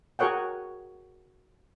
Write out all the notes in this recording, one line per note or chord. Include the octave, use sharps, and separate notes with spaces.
F#4 G#4 A#4 C#5 F#5 G5